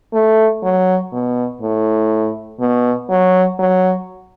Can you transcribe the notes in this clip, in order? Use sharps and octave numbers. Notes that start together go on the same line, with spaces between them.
A3
F#3
B2
A2
B2
F#3
F#3